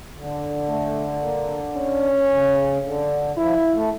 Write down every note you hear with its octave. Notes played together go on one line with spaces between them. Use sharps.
D3
A3
A#3
C#4
C#3
D3
F3 E4
A3